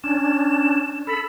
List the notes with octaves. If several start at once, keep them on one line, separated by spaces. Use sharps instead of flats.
C#4 D4 E7
A4 B5